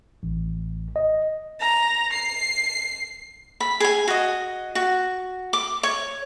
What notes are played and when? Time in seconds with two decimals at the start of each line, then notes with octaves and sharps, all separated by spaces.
0.23 A1
0.96 D#5
1.60 A#5
2.13 C7
3.60 B5
3.80 G#4 G#5
4.08 F#4 D#5
4.75 F#4
5.53 D6
5.83 C#5